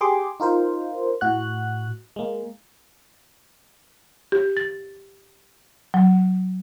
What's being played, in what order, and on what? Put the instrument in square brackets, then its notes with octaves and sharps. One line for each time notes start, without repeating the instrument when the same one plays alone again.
[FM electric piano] G4 G#4 C6 D6
D#4 F4 A#4 C5
A2 F#4 F#6
G#3 A#3
[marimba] G4
A6
F#3